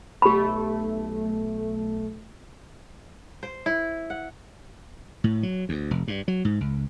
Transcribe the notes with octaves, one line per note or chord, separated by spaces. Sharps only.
B1 A3 G4 B5
C5
E4
F#5
A2
F#3
D2
F1
G2
F#3
G#2
C#2